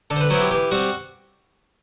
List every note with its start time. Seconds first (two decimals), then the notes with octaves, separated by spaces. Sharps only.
0.10 D3 A4
0.16 C5
0.21 B4
0.30 F#3 B3 E4 C5
0.41 G4
0.51 E3 G4
0.71 G3 C4 F#4